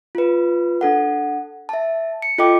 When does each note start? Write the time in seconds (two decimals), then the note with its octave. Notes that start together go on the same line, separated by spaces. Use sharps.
0.15 F4 B4
0.81 D4 A4 F#5
1.69 E5 A5
2.22 C#7
2.38 F4 A4 D#5 G5 D6